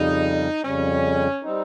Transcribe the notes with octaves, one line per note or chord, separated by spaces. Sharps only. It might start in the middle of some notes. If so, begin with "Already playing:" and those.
Already playing: F2 C#3 G3 D#4
F2 C#3 G3 C#4
G3 C4 D#4